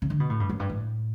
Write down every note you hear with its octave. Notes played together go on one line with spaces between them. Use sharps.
C#3
D3
B2
A2
G2
F#2
G2
A2